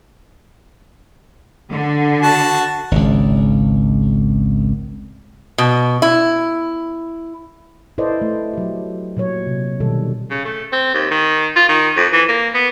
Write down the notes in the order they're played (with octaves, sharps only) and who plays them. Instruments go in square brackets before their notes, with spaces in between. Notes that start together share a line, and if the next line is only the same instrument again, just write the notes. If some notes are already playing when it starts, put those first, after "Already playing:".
[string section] D3
[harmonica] F#4 A5
[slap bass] G#1 C#2
[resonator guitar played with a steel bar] B2
E4
[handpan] E4 A4 B4 C5 D5 D#5
A3
F#3 G4
A#2 F#3 C#5
C3
B2 D#3 G3 A4
[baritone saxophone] C#3
A3
C4
D#2
D#3
F4
D#3
F2
E3
A#3
B3